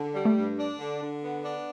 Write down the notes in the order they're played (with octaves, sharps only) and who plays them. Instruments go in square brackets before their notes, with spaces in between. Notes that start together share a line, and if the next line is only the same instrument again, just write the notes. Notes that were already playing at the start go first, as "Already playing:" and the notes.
Already playing: [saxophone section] D3
G3
[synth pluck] A3
[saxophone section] G2
D4
D3
D3
B3
D4